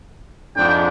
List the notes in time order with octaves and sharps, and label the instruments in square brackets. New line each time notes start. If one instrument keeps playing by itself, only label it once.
[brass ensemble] F2 G#2 D4 [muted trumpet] G5